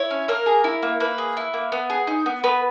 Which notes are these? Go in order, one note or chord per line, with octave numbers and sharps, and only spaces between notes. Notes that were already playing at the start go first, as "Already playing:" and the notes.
Already playing: E4 C#5
C#4
A#3 A#4
G#4
E4
A#3
A#3 B4
G#4
E4
A#3
B3
G#4
D#4
B3
B3 B4